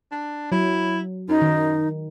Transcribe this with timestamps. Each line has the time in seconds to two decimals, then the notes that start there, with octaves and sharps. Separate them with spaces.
0.12 D4
0.52 F#3 E4
1.29 F#2 D#4
1.42 D#3